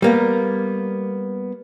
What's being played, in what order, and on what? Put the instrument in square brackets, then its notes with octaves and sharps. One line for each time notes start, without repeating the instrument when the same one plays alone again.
[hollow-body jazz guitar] G3 A#3 B3